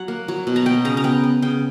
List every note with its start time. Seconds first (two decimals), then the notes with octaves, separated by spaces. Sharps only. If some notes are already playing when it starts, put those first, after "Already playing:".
Already playing: F#3 F#5
0.08 A#3
0.28 F#3
0.47 B2
0.56 A#5
0.66 B3 G5
0.85 C#3 A#5
0.97 A#5
1.04 B3 G5
1.24 B3
1.42 C#3 G5